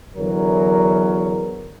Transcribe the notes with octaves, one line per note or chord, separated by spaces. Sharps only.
E2 D3 F#3 A#4